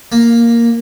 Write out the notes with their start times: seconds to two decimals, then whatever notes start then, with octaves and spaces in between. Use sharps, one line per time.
0.12 A#3